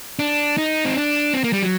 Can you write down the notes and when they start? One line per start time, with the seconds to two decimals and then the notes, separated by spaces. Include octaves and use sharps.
0.19 D4
0.57 D#4
0.85 C4
0.96 D4
1.34 C4
1.44 A#3
1.53 G3
1.63 F#3